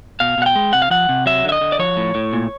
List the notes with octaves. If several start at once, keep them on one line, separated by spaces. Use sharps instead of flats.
B2 F5
B2 F#5
G5
G#3
C3 F#5
F5
F3 F#5
C3
F#3 E5
D3 E5
D#5
D3
D5
F3 C#5
A2
A2
A#2